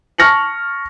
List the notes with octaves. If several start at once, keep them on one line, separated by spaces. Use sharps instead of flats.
A5 C#6 F6 A#6 C#7 F#7